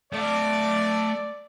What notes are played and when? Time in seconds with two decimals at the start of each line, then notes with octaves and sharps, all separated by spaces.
0.13 A3 D5 F5